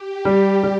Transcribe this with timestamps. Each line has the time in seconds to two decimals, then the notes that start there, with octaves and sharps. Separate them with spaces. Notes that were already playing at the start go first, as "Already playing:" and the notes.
Already playing: G4
0.25 G3
0.63 G3